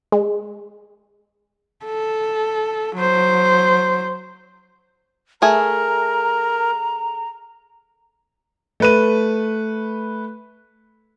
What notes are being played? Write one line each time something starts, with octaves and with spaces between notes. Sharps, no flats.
G#3
A4
F#3 C5
A3 G#4 A#4 A#5
A3 B4 D#7